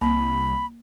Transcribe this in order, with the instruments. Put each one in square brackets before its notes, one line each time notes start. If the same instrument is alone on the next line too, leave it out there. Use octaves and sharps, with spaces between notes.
[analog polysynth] C2 [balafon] A#3 [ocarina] B5